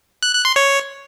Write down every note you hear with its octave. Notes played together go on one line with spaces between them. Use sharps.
F#6
F#6
C6
C#5